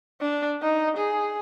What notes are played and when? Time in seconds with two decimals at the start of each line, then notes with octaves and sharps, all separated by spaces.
0.21 D4
0.62 D#4
0.97 G#4